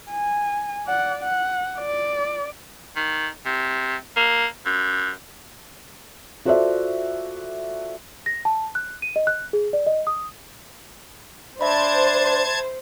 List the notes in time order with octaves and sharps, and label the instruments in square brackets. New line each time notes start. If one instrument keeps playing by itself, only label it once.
[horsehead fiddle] G#5
D5 F#5
F#5
D5
[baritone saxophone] D#3
C3
A#3
F#2
[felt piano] F4 F#4 A4 C5 D5 E5
[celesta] A#6
A5
F#6
D#7
D#5
F#6
G#4
D5
D#5
D#6
[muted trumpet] D4 [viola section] C5 [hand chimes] E5 B5 [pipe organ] A5 G#6